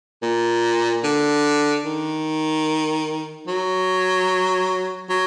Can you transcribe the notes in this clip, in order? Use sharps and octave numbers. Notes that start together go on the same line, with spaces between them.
A#2
D3
D#3
F#3
F#3